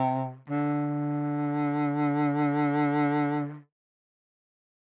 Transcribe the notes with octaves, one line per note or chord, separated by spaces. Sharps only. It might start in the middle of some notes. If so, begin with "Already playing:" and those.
Already playing: C3
D3